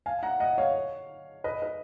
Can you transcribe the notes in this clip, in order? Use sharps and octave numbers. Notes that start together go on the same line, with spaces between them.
F5 G#5
F#5 A#5
D#5 F#5
C#5 F5
B4 D#5
B4